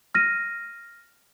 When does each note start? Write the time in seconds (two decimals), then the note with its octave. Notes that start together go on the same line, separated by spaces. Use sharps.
0.15 F6 A#6 D#7